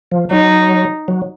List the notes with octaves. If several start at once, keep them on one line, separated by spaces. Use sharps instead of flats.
F3
F#3 D#4
F#3